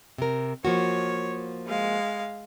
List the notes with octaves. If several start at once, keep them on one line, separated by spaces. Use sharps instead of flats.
C3 A#4
F3 A#3 F#4 C#5
G#3 F5